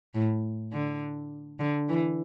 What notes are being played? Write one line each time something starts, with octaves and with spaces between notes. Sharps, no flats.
A2
D3
D3
E3